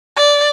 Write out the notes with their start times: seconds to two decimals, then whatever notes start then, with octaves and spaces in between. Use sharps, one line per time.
0.17 D5